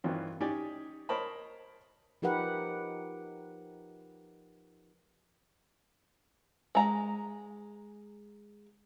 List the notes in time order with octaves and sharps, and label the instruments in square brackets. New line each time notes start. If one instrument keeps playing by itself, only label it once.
[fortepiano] G2 D#3 E3 F#3 C4 F4
C#4 D#4 G4 D5 G5 G#5
A#4 C5 C#5 D#5 A5 B5
[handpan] F3 D#4 G4 A#4 B4 F#5
[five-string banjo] G#3 A#5